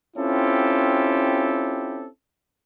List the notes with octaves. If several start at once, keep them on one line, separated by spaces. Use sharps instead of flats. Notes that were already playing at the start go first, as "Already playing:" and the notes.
C4 C#4 E4 F4 G4 A4